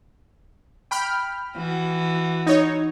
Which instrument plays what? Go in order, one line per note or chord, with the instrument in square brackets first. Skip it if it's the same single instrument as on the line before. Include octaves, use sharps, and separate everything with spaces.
[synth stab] G5 B5 F6
[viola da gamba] E3 F#4
[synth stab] D#4 C#5